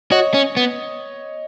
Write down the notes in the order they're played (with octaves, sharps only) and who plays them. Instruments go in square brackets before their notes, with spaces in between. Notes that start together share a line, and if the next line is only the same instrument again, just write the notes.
[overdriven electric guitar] F#4 [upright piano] C#5 D#5
[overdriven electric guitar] C#4
B3